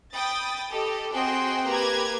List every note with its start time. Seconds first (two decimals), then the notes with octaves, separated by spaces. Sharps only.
0.14 G5 B5 D#6 A6
0.71 G4 A4 D#5
1.12 C4 F#4 G#4 D#5 G5 C6
1.66 A#3 G4 B4 A#5 G#6